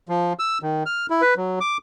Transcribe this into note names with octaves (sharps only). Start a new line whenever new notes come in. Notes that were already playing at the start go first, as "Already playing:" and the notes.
F3
E6
D#3
F6
E4
B4
F#3
D6